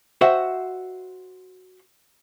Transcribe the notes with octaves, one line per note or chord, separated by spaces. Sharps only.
F#4 C5 D#5 E5 F#5 G5